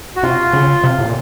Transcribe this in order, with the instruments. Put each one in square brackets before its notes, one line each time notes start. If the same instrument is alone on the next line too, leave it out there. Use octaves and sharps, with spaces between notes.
[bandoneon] F#4
[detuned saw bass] C3 [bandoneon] F4
[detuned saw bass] C#3
C3
A2
A#2